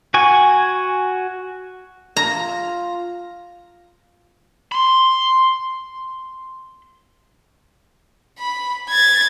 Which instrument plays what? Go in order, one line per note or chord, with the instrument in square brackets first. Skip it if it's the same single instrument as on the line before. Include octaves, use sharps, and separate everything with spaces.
[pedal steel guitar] F#4 G#5 C#6
[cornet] F4 [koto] A#5
[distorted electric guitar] B5 C6
[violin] B5
G#6 A6